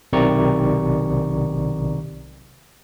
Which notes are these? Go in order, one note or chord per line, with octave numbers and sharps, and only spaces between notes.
B1 C3 D#3 D5 A#5 C#6